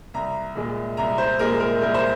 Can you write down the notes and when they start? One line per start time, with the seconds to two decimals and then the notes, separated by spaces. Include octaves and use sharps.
0.14 C2 A#5
0.55 A#2 G#3
0.97 C2 A#5
1.18 C5
1.39 A#2 G#3 A#4
1.60 A#4
1.81 C2 A#4
1.94 C5